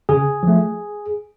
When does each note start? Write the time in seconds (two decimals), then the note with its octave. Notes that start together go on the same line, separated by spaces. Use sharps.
0.09 C#3 G#4
0.43 F3 A3